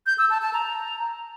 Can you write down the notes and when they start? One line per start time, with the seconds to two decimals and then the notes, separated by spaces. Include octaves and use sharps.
0.06 G6
0.18 E6
0.30 A5
0.42 A5
0.54 A#5